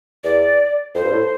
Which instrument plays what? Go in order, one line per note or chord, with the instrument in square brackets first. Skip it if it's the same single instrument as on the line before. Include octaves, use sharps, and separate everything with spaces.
[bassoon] E2 [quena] D5
[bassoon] F2 [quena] C5
[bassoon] G2
A2